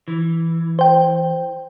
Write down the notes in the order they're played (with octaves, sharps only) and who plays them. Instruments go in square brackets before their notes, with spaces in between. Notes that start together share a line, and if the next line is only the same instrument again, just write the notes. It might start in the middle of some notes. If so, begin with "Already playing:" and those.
[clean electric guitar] E3
[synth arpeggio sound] C5 G5